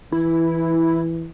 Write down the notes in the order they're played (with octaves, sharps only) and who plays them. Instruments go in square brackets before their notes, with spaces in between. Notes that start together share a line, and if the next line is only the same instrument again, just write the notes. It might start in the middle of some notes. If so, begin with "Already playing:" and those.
[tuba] E3 [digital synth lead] E4